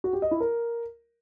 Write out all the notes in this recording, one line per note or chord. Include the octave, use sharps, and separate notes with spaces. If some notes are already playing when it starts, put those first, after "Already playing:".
F#4
G4
D#5
E4
A#4